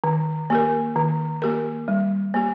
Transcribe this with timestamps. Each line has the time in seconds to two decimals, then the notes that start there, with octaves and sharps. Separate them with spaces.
0.04 D#3
0.50 A#3 G4 A#4
0.96 D#3
1.42 A#3 G4 A#4
1.88 G3
2.34 A#3 G4